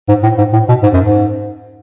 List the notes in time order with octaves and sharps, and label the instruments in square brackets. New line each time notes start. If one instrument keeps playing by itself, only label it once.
[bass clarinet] G#2
A2
G#2
A2
B2
G#2
F#2
G#2